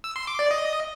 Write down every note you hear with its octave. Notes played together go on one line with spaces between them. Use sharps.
E6
C6
D6
D5
D#5